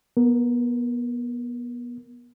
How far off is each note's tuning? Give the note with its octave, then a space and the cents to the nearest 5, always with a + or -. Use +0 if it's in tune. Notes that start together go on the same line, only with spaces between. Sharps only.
B3 -30 A#4 +0